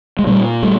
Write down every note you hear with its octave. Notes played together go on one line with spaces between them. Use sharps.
G#3
A#2 G3 A3
G3 A3